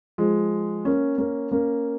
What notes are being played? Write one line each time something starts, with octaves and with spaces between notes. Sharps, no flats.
F3 G#3
A#3 C#4
A#3 C#4
A#3 C#4